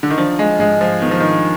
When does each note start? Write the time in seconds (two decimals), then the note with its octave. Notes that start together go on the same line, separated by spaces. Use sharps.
0.03 D3
0.10 D#3
0.18 F3 D4
0.39 G#3
0.59 G#2 G#3
0.81 F3
1.02 D#3 B3
1.11 F3
1.20 D#3